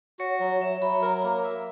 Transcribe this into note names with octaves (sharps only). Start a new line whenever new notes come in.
F#4 C#5
F#3
F#3 E5
F#3 B5
A#4 A#5
A#3
E5